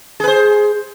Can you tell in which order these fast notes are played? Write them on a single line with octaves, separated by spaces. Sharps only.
G#4 B4 C5